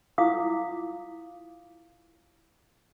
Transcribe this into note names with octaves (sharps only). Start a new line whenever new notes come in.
E4 F4 F5 D6 D#6